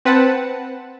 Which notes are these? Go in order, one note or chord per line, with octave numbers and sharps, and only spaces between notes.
C4 B4 F#5 A5